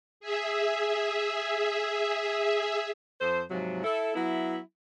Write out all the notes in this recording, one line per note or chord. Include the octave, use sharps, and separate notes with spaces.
G#4 E5
F2 A4 C5
G#2 C3 F3 F#3
E4 A4
F#3 B3 E4